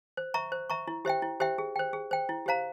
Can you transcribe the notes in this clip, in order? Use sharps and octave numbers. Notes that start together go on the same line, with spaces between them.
C5
E5 A#5 C#6
C5
E5 A#5 C#6
E4
G4 C5 E5 G5
E4
G4 C5 E5 G5
G#4
C5 G5
G#4
C5 G5
E4
G4 C5 F5 A#5